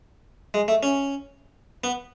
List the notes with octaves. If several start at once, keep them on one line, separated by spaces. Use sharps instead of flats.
G#3
A3
C#4
B3